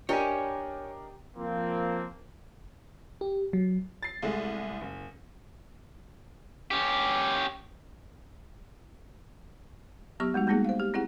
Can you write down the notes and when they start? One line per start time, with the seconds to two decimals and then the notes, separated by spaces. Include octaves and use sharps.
0.09 D4 G4 A#4 C#5 D#5 G#5
1.37 F3 A#3 C4
3.21 G4
3.53 F#3
4.03 A6 C7
4.22 C2 G#3 A3
4.81 F#1
6.71 C#4 G4
10.20 F#3 B3 G4 C#6
10.34 G3 G#3 D#4 F#4
10.47 G3 G#3 A#3 B3 D#4 G#4
10.65 C5 F5
10.80 G4
10.94 C4 E4 G#4 F#5